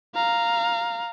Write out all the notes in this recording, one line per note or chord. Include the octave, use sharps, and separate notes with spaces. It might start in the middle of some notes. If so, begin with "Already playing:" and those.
F5 A#5